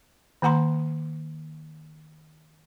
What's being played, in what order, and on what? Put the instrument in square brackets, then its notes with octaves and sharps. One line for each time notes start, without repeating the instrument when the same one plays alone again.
[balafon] D#3 A#3 F#5 A#5 C6